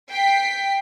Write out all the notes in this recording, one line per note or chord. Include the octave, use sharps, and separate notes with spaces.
G5 B6 C7